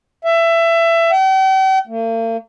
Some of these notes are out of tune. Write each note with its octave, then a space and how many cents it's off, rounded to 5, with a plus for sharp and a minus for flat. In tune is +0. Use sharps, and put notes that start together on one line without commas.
E5 +20
G5 -45
A#3 -45